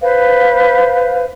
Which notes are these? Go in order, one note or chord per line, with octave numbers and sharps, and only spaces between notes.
B4 C5 F5